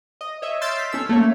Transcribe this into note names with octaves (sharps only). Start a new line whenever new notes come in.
D#5
C#5 D#5 E5
C6 E6 F6 G6 A6 D7
B6
C#4 A4 E6
A3 A#3 C#5